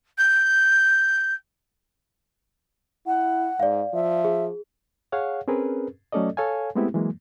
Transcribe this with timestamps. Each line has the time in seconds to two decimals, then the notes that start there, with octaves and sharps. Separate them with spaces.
0.18 G6
3.06 E4 F#5
3.60 G#2 D5 F5
3.93 F3 E5
4.24 G#4
5.12 G#4 C#5 F5 F#5
5.48 C4 C#4 G#4 A#4 B4
6.12 F#3 A3 C#4 A4 D5 D#5
6.37 A4 C#5 F5 G#5
6.75 G#3 A3 B3 C4 E4 G4
6.94 E3 F#3 G#3 A#3